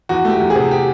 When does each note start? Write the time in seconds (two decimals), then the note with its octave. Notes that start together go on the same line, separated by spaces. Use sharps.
0.09 E2 F#4
0.25 A3 G4
0.40 E2
0.50 G#4
0.55 C3
0.71 G4